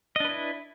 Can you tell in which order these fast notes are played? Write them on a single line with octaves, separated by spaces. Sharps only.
D#5 D4 B4 E4